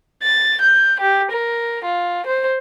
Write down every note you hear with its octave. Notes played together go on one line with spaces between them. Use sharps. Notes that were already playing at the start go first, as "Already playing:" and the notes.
A6
G6
G4
A#4
F4
C5